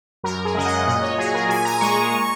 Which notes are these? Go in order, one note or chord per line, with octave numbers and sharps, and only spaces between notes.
F#2 A#4
G#4
C#3 G#3 D#5
F#5
A#2 D#5
C#5
F#3 G#4
A#4
A#2 G#5
A#5
G#3 C#6
C#6
C#6